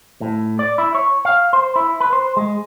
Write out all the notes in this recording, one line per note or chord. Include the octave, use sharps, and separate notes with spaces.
A2
D5
E4
C#5
F5
C5
E4
B4
C5
G#3